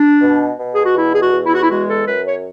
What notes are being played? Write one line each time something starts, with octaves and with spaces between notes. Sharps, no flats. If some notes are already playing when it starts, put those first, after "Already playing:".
Already playing: D4
B2
B2
G#4
F#4
E2 E4
G#4
F#4
E2
E4
F#4
E4
G#3 F#4
A4
F#2 B4
C#5